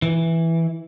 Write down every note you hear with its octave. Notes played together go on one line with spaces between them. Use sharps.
E3